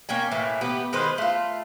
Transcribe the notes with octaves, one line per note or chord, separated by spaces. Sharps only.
A#3 C#4 G5 G#5
A2 E3 A#3
B3 G4
D#3 G#3 B4 C5
A3 F4